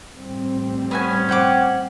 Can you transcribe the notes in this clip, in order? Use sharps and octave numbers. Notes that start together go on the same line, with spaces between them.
A1 G3 C4
B3 C#4 F#4 G#5
C5 F#5 G5 D6